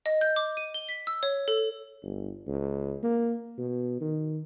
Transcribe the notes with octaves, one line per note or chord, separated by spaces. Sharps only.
D#5
G6
D6
D#7
G7
B6
E6
C#5
A4
G1
C#2
A#3
B2
D#3